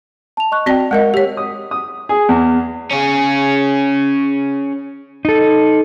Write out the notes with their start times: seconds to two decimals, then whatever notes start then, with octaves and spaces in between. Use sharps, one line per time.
0.37 A5 F7
0.52 D#5 C#6 F#6
0.66 C4 F#4 D5 G5 A5
0.91 G#3 A#4 D#5 F#5
1.14 G4 C#5
1.37 D#6
1.71 D#6
2.09 G#4
2.29 E2
2.91 C#4 G#4
5.25 D#4 A4